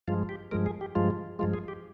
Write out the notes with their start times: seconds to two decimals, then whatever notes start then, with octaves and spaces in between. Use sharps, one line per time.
0.08 G2 F3 G#3 F4
0.29 G4
0.51 G2 F3 G#3 A#4
0.66 G#4
0.81 G4
0.95 G2 F3 G#3 F4
1.39 G2 F3 G#3 F4
1.54 G#4
1.68 G4